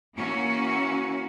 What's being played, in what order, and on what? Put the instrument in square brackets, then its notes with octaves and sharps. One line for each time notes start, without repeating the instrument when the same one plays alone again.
[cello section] E3 A#3 C#4 F#4